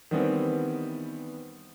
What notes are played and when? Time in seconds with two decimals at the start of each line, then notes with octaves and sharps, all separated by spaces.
0.11 D#3 E3 G3 B3 C4